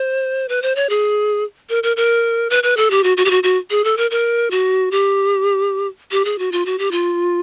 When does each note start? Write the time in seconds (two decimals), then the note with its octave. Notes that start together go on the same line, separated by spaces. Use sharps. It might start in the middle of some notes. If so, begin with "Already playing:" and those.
Already playing: C5
0.49 B4
0.62 C5
0.76 C#5
0.89 G#4
1.70 A#4
1.83 A#4
1.97 A#4
2.50 B4
2.63 B4
2.77 A4
2.91 G4
3.04 F#4
3.17 F#4
3.25 G4
3.31 F#4
3.43 F#4
3.71 G#4
3.84 A4
3.97 A#4
4.11 A#4
4.51 F#4
4.91 G4
6.12 G4
6.25 G#4
6.39 F#4
6.52 F4
6.66 F#4
6.79 G4
6.92 F4